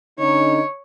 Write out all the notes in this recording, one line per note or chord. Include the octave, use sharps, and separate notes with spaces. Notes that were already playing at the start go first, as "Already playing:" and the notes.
D3 C#4 D#4 C#5